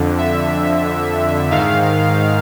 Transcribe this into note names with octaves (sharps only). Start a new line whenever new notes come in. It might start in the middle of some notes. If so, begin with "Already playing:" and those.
Already playing: F2 D3
E5
G#2 D#3 F5